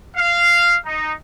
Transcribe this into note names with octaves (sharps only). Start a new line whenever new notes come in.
F5
D#4